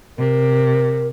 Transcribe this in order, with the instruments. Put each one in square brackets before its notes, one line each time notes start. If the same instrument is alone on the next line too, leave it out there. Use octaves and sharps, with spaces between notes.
[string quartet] C3 [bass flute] A#4